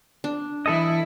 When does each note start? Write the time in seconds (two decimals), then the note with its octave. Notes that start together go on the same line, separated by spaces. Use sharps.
0.24 D4
0.66 E3 E4 A4 D#5